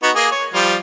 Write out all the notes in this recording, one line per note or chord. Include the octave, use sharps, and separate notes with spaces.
B3 D#4 F#4
A#3 G#4
C#5
F3 G3 F4